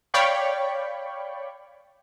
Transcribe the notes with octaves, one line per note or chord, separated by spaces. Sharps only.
C#5 D5 F5 G5 B5 C#6